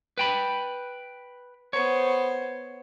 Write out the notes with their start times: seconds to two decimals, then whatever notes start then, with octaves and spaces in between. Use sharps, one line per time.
0.18 B4 G5 B5
1.73 B3 C5 C#5